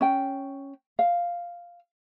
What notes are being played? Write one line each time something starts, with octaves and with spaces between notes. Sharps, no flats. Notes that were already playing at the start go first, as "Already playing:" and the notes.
C#4 G5
F5